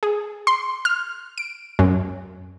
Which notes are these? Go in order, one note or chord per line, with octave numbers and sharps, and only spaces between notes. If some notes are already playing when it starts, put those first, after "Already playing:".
G#4
C6
F6
D7
F#2